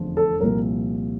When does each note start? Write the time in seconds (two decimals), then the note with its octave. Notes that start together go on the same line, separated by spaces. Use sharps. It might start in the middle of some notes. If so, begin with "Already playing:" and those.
Already playing: F1 E2 D3 F3
0.17 A4
0.41 C2 A#2 F3 A#4